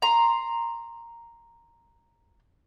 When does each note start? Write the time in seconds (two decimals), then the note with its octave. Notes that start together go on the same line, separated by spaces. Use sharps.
0.02 A#5 C6